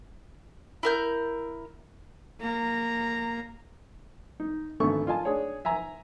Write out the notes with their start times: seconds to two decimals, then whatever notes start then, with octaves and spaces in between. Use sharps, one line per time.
0.83 E4 A#4 G6
2.41 A#3 A#5
4.40 D#4
4.80 G#1 D3 A3 B3 A4 C#6
5.07 F4 D#5 G#5 A5
5.25 D4 G#4 C#5
5.65 E5 G#5 A#5